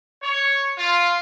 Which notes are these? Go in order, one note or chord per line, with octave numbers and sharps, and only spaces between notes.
C#5
F4